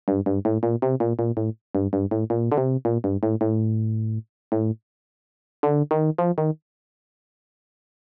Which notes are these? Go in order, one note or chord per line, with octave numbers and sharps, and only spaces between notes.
G2
G2
A2
A#2
C3
A#2
A#2
A2
G2
G2
A2
A#2
D3
C3
A#2
G2
A2
A2
A2
D3
D#3
F3
D#3